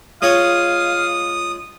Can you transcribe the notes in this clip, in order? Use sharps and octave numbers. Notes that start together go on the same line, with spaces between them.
G#3 F4 C#5 F5 D#6